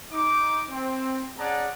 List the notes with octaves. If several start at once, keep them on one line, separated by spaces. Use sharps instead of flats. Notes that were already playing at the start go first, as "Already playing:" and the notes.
D#4 D6
C4
C#4 G#4 D5 F#5 A5 A#5